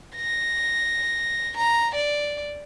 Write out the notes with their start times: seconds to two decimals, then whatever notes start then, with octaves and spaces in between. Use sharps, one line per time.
0.16 A#6
1.57 A#5
1.95 D5